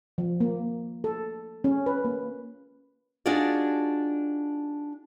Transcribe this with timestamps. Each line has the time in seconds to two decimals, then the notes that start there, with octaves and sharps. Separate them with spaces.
0.18 F3
0.40 A#3
1.04 A4
1.64 C#4
1.86 B4
2.05 A#3
3.26 D4 D#4 F4 F#4 G#4 D5